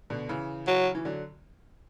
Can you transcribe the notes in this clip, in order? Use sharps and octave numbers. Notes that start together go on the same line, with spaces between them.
B2 D3
C#3 E3
F#3
E3
D3 F#3